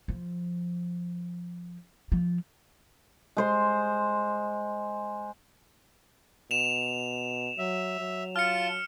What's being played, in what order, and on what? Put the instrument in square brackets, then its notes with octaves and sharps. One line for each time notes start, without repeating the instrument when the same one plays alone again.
[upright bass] F3
F3
[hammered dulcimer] G#3 C5 C6
[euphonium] B2 [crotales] E7 F7
[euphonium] F#3 [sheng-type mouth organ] E5
[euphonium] F#3
[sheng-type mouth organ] F4 A5 [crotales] F6 C#7